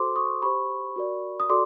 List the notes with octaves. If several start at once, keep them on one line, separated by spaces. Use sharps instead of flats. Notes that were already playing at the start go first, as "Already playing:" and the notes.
Already playing: F#4 A4 C5 C6 D6
C#6 D#6
G4 C5 B5 C#6
F#4 A#4 D5
D#6
F#4 A4 D5 C6 D6